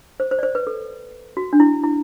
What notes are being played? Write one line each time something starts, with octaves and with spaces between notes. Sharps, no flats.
C5
C5
D5
C5
B4
A4
F#4
D4
E4
E4